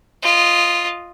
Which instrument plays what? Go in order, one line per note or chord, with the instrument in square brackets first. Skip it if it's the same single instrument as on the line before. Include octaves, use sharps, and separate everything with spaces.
[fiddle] F4 D#5